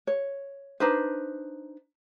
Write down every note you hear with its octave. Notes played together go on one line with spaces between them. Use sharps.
C#5
D4 D#4 B4 C5